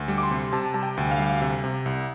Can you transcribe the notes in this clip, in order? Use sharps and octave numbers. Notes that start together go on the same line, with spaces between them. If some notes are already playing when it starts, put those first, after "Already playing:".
Already playing: D2
G3
D6
C6
C3
C3 A5
G3 A5
G5
D2
F5
G3
C3
C3
C2